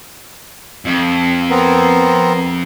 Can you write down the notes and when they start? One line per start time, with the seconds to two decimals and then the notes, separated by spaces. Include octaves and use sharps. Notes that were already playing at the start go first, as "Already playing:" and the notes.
0.85 F2
1.50 B3 C4 A#4